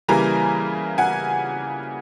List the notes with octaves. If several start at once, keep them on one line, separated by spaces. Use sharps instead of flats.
C#3 E3 G3 A#3 G#5 A#5
F#5 G#5